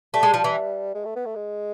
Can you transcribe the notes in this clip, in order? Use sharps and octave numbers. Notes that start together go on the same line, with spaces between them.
G3 A3
G#3
F3
E3
G#3
A3
B3
A3
G#3